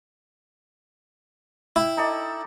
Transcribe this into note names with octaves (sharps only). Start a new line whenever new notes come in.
E4 G5
D#4 A4 D5